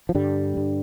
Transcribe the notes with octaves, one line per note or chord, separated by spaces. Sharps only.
F3
G2 D3 G3
G2